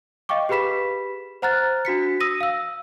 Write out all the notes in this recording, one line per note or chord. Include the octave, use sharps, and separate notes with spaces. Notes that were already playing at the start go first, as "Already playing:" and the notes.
D#5 F5 G5 C#6 D6
G4 G#4 B4 B5 B6 E7
C5 F#5 A#5 F6 F#6 A6
D4 F#4 B6 C#7
D#6 E6 A#6 D#7
F5 E6